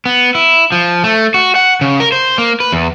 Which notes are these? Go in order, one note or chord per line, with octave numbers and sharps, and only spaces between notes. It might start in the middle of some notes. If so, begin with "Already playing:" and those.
B3
E4
F3
A3
F#4
F#5
C#3
A#4
C5
A#3
B4
E2